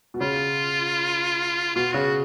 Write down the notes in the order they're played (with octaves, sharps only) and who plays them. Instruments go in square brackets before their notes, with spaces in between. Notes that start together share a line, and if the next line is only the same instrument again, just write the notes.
[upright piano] B2
[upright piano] C#3 [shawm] F4
[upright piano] B2 [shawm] F4
[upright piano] C#3 [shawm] F#4